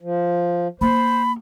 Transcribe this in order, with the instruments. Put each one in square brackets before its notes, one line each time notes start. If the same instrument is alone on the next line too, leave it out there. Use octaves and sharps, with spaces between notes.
[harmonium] F3
[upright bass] A#3 [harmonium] C5 [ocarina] B5